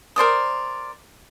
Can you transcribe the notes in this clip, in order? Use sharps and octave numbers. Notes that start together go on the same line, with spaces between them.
A#4 C5 D5 D#6